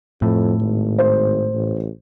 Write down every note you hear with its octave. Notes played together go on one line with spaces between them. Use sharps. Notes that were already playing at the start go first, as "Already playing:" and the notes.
F2 A2
G#1
C5
A1